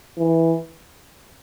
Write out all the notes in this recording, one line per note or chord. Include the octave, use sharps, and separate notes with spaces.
E3